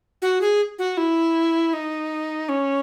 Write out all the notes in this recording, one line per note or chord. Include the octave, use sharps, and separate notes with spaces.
F#4
G#4
F#4
E4
D#4
C#4